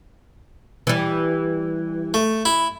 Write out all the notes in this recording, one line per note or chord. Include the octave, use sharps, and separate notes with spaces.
E3 G3
A3
E4